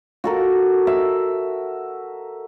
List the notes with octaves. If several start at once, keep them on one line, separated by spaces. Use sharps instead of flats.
F#4 A4 A#4
E5